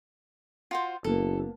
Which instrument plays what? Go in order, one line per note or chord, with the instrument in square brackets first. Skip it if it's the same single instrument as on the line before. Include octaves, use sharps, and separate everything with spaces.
[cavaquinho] F4 F#4 C5
[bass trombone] F#1 [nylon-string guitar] A#3 B3 [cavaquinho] A4